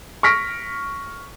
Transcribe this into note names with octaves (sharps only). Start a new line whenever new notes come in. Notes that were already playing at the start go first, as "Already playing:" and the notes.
C#6 F6 A#6 B6 D7